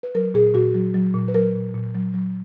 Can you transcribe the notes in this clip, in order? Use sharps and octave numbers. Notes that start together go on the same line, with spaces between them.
B4
F#3 A#4
A#2 G#4
A#2 F#4
F#3
F#3
A#2
B4
F#3 A#4
A#2
A#2
F#3
F#3